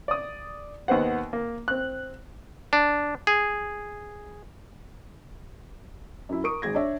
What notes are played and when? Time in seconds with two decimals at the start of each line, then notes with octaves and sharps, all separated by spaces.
0.08 D5 D#6
0.88 D#2 B3 C5 F#5
1.33 A#3
1.68 C4 F#6
2.73 D4
3.27 G#4
6.29 F#2 E4
6.44 A#4 C#6 D#6 D7
6.62 G#1 G#4 G#6 A#6
6.75 D4 C#5 D5 E5